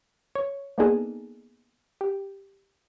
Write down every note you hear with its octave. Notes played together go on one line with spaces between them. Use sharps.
C#5
A#3 B3 D4 D#4 G#4 A4
G4